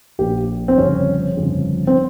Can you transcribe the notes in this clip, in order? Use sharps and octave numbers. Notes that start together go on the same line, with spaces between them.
A#1 A#2 G4
C4
G1 F2 C#3 C#4
G1 F2 C#3
C4